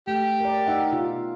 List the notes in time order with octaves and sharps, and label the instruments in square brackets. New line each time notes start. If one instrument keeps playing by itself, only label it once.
[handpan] A3 [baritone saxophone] G4
[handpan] A#4 D5
D#4 E5 F#5
B2 D#4 F4